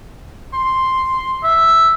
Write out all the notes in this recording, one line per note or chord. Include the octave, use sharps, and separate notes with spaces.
C6
E5